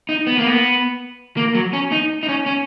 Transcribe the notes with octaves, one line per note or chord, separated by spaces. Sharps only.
D#4
B3
A#3
B3
A#3
F#3
C#4
D#4
D#4
C#4
C#4